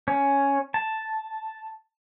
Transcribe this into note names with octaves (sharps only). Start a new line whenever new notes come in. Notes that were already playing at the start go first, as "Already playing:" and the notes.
C#4
A5